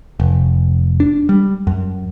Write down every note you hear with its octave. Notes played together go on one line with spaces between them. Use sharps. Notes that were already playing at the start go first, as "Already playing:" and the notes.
F1
D4
G3
F#2